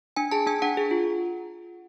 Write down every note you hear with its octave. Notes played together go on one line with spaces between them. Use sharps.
D4 G#5
G#4 A5
D4 G#5
D4 F#5
G#4
F4